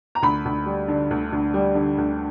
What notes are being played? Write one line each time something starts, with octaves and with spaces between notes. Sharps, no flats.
A#5
D2 B5
D2
G3
D3
D2
D2
G3
D3
D2